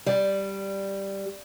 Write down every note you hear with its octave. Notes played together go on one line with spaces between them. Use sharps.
G3